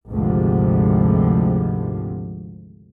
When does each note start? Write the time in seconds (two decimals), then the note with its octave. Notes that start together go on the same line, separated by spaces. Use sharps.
0.11 G#1 D2 C3 F3